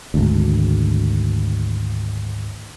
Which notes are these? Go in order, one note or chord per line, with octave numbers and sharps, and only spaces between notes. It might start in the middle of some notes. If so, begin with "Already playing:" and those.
G#1 D2